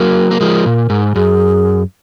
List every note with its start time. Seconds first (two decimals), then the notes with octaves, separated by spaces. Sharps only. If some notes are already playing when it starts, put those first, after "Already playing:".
Already playing: F#3 A#3 A#4
0.31 A#3
0.41 F3 G#3
0.66 A#2
0.90 G#2
1.15 F#2 G#4